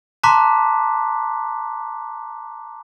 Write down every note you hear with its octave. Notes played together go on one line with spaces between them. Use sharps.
A5 A#5 C6 D6 F#6 B6